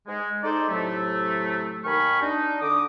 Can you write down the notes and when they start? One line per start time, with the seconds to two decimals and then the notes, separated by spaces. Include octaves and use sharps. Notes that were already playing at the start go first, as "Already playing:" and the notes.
0.07 G#3
0.44 G#3 D#4 A4 C5 D5
0.69 A2 C3 F#3 A3
1.85 D#2 D#3 G#5 B5 C#6 F6
2.22 D4 D#4
2.61 D3 D6 D#6